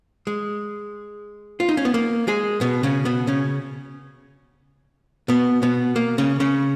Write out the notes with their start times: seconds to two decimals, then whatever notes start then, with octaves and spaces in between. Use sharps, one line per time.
0.27 G#3
1.60 F4
1.69 D#4
1.77 C#4
1.85 B3
1.94 A#3
2.28 G#3 G#4
2.61 B2 B3
2.83 C#3 C#4
3.05 B2 B3
3.27 C#3 C#4
5.28 B2 B3
5.63 B2 B3
5.96 A#3
6.18 C#3 C#4
6.40 C#3 C#4